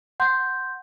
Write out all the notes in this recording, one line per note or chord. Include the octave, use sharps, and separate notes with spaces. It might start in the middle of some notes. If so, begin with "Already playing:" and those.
F#5 C6 G6